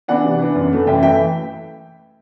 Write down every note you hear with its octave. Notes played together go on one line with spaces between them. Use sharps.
E3 B3 D4 D5 F#5
C3
E3 B3 D4
F#2
E3 A3
F#2 E5 G5
E3 A3 E5 G5